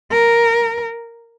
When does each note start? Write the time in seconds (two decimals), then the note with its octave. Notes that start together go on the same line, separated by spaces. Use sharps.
0.11 A#4